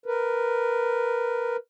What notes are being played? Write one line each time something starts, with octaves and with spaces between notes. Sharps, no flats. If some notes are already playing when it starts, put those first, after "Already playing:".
A#4 B4